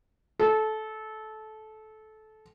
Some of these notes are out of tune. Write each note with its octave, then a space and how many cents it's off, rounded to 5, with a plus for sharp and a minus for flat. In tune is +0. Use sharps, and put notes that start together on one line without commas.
A4 -20